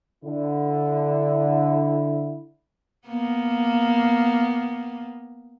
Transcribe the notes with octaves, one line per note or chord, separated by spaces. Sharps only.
D3 E4
A#3 B3